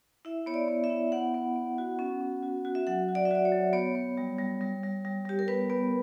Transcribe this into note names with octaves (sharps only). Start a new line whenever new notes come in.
E4 E5
B3 C#5
D5
B3
E5
E4
B3 F#5
B3
B3
F#4
C#4
C#4
F#4
F#4
E5
F#3 F#5
F#4
D5
E5
F#4 D5
C#5
F#3
B3 C#5
B3
G3
G3
G3
G3
G3
G3 G4
A#4
B3 B4
B3